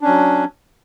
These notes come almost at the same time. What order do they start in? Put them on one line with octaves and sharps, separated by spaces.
D4 C#4 F#3